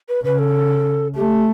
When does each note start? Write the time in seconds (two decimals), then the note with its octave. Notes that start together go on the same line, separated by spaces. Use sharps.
0.09 B4
0.24 C#3 B4
0.39 A4
1.16 A3 G4